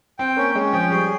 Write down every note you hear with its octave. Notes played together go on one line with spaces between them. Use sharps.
C4 G5
A#3 C#4
G#3 C#4
F3 G5
G3 G#4